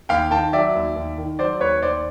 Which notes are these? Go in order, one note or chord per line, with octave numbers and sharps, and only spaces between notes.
D#2 F5 G5
D#3 G5 A5
F#3 D5 E5
D#2
D#2
D#3
F#3 C5 D5
D#2 B4 C#5
D#2 C5 D5